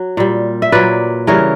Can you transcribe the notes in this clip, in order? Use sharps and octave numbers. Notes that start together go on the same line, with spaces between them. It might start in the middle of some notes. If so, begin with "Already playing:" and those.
Already playing: F#3
A#2 G3
E5
A#2 F#3 B4 D5
C#3 E3 G3 A#4 C#5